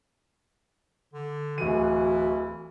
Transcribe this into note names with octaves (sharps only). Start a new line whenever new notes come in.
D3
D1 E3 F#4 D#7